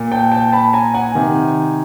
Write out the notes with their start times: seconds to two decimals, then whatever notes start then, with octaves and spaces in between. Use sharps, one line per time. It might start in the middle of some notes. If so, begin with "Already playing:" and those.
Already playing: A#2
0.12 G5 A5
0.32 G5 A5
0.52 A5 B5
0.73 G#5 A#5
0.94 F#5 G#5
1.15 C3 D#3